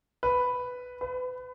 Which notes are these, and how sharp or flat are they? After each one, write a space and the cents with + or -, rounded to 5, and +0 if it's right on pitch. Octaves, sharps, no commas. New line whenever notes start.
B4 +5
B4 +30